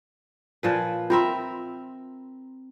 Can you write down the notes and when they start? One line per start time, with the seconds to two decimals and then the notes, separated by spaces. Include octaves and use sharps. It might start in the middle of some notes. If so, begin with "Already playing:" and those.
0.63 A#2 F3 B4
1.10 C4 F4 A#4 E5 B5 C6